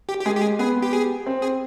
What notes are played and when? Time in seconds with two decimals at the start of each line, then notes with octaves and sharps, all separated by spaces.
0.09 G4
0.21 G4
0.25 G#3 G#4
0.36 G4
0.42 G#4
0.59 B3 G#4
0.82 G4
0.93 G#4
1.26 C4
1.42 G#4